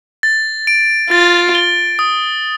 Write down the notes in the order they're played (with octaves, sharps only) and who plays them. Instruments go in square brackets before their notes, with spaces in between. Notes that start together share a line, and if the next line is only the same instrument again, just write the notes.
[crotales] A6
D7
[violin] F4 [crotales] A6
[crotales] G7
D#6